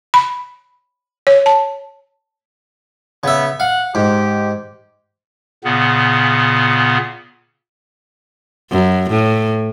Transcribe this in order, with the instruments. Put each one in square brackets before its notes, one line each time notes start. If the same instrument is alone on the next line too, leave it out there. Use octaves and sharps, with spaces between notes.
[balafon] B5
C#5
A5
[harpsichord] C#3 E5 [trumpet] B3
[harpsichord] F5 [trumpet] F#5
[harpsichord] G#2 [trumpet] G4
[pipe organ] A#2 C#3 B3
[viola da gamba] F#2
A2